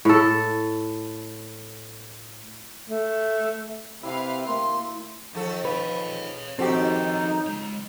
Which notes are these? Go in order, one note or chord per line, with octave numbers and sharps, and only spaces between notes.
A2 A4
A3
C3 E4 B4 E5 F5 G5
D2 A#3 C6
D#3 F3 A4
B4 C#5 F5
D#2 F3 C4 D4 D#4 F#4 G4 A4
G#3 C#5